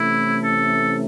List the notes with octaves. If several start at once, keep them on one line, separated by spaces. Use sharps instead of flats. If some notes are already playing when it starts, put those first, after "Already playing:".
Already playing: C3 E3 A3 C#4 E4
A4